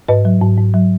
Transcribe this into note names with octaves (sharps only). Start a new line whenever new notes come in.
G#2 B4 D#5
F#3
G#2
G#2
F#3